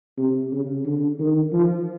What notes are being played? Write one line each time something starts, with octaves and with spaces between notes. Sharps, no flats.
C3
C#3
D3
D#3
F3